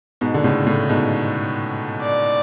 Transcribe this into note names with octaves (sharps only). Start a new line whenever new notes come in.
G#2 B2
D3
A2 C#3
A2 C#3
G#2 B2
D5